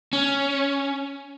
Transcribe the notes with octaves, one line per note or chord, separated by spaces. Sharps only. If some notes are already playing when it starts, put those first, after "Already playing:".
C#4